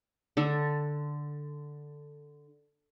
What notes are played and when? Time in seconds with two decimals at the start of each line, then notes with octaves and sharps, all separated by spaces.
0.37 D3 A4